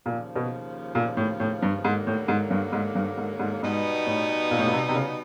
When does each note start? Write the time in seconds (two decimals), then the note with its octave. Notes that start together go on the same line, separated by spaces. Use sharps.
0.06 D#2 A#2 C#3 F3
0.36 B2
0.95 A#2
1.17 A2
1.40 A2
1.62 G2
1.84 D#2 G#2 D3 F#3 A#3
2.07 A2
2.28 G#2
2.50 G2
2.72 G#2
2.95 G2
3.17 G#2
3.39 G#2
3.62 G#2 B2 G3 B3 D#4
4.07 A2
4.51 A#2
4.59 A2
4.66 A#2
4.73 C3
4.89 C3
4.95 C#3